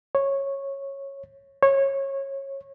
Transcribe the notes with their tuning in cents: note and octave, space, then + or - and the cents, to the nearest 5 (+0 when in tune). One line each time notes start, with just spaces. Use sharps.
C#5 -10
C#5 -20